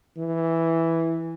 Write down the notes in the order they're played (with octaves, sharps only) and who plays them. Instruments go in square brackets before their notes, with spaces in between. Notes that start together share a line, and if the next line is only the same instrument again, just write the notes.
[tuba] E3